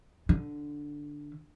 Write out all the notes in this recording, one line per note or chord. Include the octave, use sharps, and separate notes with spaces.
D3